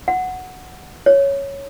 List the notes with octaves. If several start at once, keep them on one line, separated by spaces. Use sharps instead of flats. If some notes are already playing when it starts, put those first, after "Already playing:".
F#5
C#5